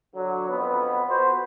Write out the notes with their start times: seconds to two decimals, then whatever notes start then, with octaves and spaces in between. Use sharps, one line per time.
0.16 D3 F#3
0.50 F2 B3
1.10 F#4 B4 C5